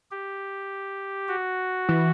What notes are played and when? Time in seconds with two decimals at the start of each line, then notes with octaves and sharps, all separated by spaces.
0.11 G4
1.28 F#4
1.89 E3